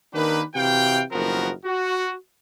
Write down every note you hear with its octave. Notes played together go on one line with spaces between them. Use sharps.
D#3 A#3 D4 G4 B4
C3 E3 F#4 F5 G5
F#1 D#2 F3 B3 F#4 A#4
F#4